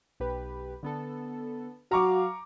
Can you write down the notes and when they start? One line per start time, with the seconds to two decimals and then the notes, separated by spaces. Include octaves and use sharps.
0.20 B1 G4 B4
0.83 D3 B3 A4
1.91 F#3 F#4 F5 A#5 C#6 D6